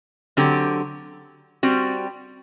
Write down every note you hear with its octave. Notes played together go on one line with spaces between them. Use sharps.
D3 F#3 C4 G4
G3 C4 F#4